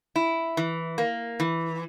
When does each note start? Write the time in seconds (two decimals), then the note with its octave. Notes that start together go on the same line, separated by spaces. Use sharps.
0.16 E4
0.57 E3
0.98 A#3
1.40 E3